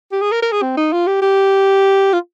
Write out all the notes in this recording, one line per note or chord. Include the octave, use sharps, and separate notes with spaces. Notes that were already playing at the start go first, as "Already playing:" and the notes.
G4
G#4
A#4
A#4
G#4
C4
D#4
F4
G4
G4
F4